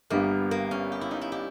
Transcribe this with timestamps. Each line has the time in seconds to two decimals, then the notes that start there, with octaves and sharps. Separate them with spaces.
0.10 G1 G2 G3 A#3 B3
0.51 A#3
0.71 C#4
0.92 G4
1.01 E4
1.11 D#4
1.21 E4
1.32 G4